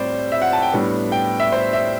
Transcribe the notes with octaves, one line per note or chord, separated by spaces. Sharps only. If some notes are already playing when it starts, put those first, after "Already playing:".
Already playing: A2 G3 C4 C5 D5
E5
F#5
A5
G5
A2 G3 B3 D4
G5
E5
C5
E5